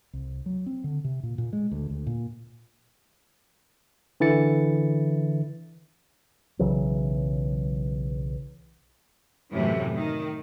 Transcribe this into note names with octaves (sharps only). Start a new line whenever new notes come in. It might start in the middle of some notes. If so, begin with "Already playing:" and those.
C2
F#3
C4
D3
C3
A#2
A#2
G#3
D2
D2
A#2
D3 E3 E4 A6 C#7
B1 C#3 E3 F#3
F#2 A2 C3 E3
D#3